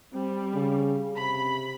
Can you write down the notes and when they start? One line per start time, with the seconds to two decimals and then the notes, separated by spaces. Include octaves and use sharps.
0.13 G3 C4
0.54 C#3
1.16 C3 B5